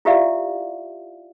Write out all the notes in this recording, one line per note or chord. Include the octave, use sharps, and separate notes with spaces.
E4 F4 G4 D5 E5 F5